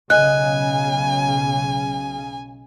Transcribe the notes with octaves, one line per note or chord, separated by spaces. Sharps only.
B1 C#3 D#5 G#5 F#6